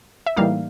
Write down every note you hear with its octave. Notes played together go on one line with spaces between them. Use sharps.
E5
A2 E3 G3 A#3 D#4 F5